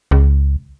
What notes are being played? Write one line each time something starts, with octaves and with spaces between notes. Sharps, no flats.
C#2